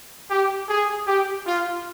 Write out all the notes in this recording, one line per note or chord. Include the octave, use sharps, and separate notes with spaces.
G4
G#4
G4
F4